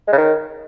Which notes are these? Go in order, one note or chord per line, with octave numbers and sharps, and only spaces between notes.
G#3
C#3
D#3